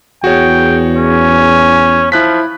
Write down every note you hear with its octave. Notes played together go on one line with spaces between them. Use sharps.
E2 F#4 G#4 C#5 G5
C#4
F3 E4 F#6 B6